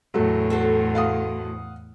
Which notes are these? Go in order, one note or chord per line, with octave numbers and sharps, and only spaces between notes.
E2 A2 F#3 A3
F#4 A4 C5
F5 F#5 D#6